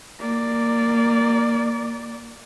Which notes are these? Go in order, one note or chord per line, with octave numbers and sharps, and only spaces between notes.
A#3 D5